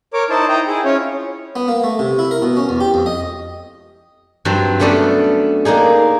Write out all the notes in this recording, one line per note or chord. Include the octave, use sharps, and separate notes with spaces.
A#4 C#5 D6
D#4 E4 C5 A5
D#5 G5 A#5
E4 G#4
C#4 F4 C#5
B3
A#3
A3
C3
E4
A#4
B2
C#4
E2
G4
F2
D#5
G2 F#3 C4 A5 B5 C6
A3 B3 C#4 D4 A4
A#3 D4 D#4 G#4